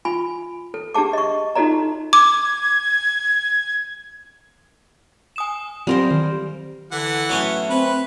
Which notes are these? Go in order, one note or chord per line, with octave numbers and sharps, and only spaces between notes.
F4 G#5 B5
A4
D4 G4 G#4 A5 D6
D#5 C#6
D#4 F4 F#4 A4 D5 A#5
D6 G#6
G#5 D#6 E7
F#3 G3 C4 A#4 C5 C6
D#3
D3 E3 F#5
F#3 A3 B3 C#4
C4 B4